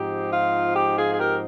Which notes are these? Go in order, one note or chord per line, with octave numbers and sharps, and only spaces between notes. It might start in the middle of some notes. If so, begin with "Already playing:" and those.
Already playing: G#2 F3 C4 D#4 G4
F4
G4
F4 G#4
G#4
G4 A#4